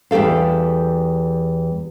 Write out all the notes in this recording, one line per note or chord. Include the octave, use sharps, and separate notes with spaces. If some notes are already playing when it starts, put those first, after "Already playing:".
E2 G3 G4 A4 F5